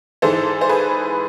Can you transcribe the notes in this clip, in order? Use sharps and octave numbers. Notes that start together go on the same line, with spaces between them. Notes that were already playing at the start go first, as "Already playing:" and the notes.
G#2 E3 G#3 A4 C5
C5
G#4 B4